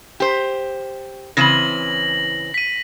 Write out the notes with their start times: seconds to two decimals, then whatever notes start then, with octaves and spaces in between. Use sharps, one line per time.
0.20 G4 C5
1.37 C#3 E3 C4 A#6 F#7
2.54 B6 D#7